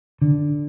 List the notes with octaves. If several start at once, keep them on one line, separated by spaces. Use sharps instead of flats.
D3